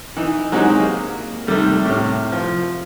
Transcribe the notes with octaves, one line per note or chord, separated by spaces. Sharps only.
E3 D#4
F#3 G#3 C4 D#4 G4
A#3
C3 D#3 G3 A3
A2 C3 F6
F3